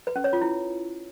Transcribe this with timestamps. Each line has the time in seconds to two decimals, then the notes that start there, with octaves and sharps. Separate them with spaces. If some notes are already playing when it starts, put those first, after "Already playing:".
0.07 B4
0.16 C#4
0.24 C#5
0.33 F4
0.41 E4